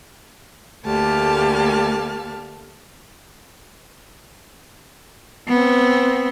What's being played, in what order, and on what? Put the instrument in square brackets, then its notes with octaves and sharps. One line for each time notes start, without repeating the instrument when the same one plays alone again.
[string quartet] D2 A3 A#3 G4 A5 F6
[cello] B3 C4